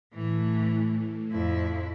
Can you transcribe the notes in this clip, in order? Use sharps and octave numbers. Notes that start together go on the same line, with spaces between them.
A2 E3 A3
F2 E4